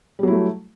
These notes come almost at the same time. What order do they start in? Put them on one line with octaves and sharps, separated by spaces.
G3 F#3 E4 A3